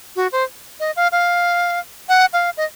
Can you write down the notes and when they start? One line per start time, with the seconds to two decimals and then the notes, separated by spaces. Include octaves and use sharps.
0.16 F#4
0.32 C5
0.80 D#5
0.96 F5
1.12 F5
2.09 F#5
2.33 F5
2.57 D#5